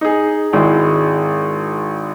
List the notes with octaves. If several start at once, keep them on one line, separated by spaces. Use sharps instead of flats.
D#4 G#4
G#1 G#3 E4